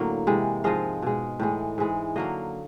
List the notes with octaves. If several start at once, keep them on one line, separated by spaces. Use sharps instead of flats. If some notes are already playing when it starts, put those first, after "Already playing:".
Already playing: A2 D3 F#3 A#3
C3 E3 G#3
G#2 F3 G#3 D#5 F5
B2 G#3
A2 E3 G#3
G#2 E3 G#3
D3 F#3 A#3 D#5 F5